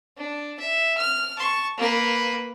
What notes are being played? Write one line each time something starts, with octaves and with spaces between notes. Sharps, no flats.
D4
E5
F6
A5 C#6
A#3 B4